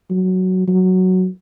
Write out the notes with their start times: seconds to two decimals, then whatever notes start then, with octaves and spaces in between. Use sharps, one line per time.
0.10 F#3
0.68 F#3